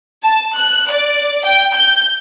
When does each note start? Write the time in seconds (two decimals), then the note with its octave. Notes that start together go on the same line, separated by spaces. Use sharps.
0.23 A5
0.56 F#6
0.91 D5
1.45 G5
1.75 G6